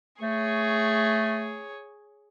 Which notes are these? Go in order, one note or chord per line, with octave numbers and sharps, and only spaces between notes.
A3 G#4 C#5